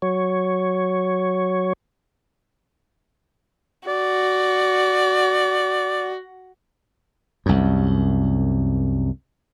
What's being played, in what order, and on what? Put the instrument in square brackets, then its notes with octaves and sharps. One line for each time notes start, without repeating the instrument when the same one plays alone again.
[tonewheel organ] F#3 C#5
[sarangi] F#4 [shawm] D5
[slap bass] C2 F#2